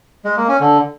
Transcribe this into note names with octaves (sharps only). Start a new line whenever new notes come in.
G#3
A#3
C#4
D3